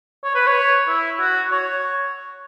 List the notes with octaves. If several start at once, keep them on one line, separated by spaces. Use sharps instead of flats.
C#5
B4
C#5
E4
F#4
C#5